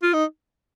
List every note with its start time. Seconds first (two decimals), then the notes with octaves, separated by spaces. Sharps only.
0.03 F4
0.13 D#4